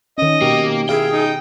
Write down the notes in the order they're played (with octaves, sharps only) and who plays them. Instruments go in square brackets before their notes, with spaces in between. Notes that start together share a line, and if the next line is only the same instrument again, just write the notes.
[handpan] D#3 C#4 [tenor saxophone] D#5
[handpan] B2 G4 [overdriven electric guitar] A#3
[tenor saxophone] E4 [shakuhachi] G#4 [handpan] F5 [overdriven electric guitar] G5
[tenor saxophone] D#4